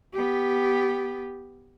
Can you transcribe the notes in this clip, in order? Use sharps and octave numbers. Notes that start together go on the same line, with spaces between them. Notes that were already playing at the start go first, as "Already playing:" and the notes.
B3 G4